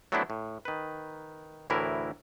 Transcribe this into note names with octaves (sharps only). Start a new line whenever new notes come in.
F#3 A3 B3 C4 D4 E4
A2
D#3 B4
D2 A2 E3 E4 A#4